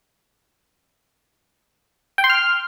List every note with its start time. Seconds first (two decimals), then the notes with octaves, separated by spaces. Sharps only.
2.18 G5
2.24 C6
2.30 F6